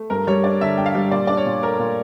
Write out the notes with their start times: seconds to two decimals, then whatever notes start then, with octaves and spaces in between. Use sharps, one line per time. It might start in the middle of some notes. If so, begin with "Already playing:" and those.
Already playing: A3
0.10 G2 A#4
0.27 G3 C#5
0.44 D4 D5
0.61 D3 E5
0.78 G2 G5
0.86 F5
0.95 G3
1.11 A#2 D5
1.27 D4 D5
1.37 C#5
1.46 A#2
1.62 A3 A#4
1.79 A#2